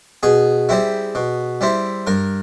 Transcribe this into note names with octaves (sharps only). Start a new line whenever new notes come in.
B2 G#4
G3 C4 E4
B2
G3 C4 E4
G2 A#4